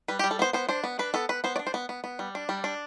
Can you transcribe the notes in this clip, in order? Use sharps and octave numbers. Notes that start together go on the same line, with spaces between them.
G3 B4
G4
G3
A4
B3 C5
B3 C5
D4 C5
B3
D4 B4
B3 A4
B3 B4
B3 C5
D5
D4
C5
B3
B3
B3
G3
D4
G3
D4